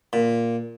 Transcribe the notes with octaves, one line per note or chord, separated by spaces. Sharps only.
A#2